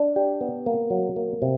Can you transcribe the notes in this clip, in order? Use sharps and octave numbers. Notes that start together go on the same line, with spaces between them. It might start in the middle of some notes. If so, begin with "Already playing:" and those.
Already playing: D4
G4
B3
A#3
F#3
A#3
C3